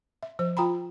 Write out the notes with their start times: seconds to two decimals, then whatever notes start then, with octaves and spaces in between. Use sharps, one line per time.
0.23 E5
0.39 F3 C5
0.57 F4 G5 A#5 B5